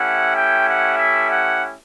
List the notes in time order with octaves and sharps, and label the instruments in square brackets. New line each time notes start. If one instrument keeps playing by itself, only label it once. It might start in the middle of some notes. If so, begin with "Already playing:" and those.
Already playing: [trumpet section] A3 C#4 E4 G4 F#5
G5
F#5
E5
F#5